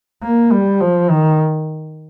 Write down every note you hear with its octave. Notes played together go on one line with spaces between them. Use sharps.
A#3
G3
F3
D#3